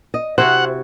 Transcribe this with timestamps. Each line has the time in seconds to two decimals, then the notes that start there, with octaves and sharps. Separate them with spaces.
0.14 D#5
0.38 C3 E4 F#4 C5 F#5